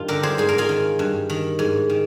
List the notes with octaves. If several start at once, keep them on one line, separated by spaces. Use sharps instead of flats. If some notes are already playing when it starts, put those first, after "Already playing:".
Already playing: G2 D#3 F4
D3 G4 A#4
G#4 C5
G#2 G#4
A#4
F4 G#4
D#3
G2
D#3
G#2
D#3